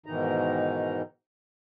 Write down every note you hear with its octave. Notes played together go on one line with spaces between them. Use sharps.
G#2 B2 D#3 E3 D#4 A#5